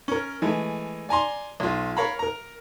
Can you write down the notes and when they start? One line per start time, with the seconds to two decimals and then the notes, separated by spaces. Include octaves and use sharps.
0.08 C#4 A#4
0.42 E3 G#3 A3
1.09 D5 G#5 A#5 C6
1.60 B1 F4
1.97 A#4 C#5 F5 A#5 B5
2.19 A#4 A#5